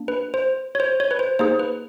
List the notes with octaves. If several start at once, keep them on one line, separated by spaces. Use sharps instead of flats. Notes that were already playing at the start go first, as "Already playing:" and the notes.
Already playing: A#3 D4
B4
C5
C#5
C5
C#5
B4
C5
A#3 D#4 G#4 C5
B4